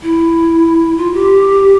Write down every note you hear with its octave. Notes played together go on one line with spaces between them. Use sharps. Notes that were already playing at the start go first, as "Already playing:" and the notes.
E4
F4
G4